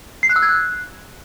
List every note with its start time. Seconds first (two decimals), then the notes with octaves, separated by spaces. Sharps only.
0.23 C7
0.29 F#6
0.36 E6
0.42 G#6
0.49 F#6